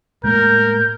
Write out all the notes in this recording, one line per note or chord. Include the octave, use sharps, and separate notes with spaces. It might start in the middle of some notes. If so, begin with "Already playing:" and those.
A2 G#3 A#3 A#4 G6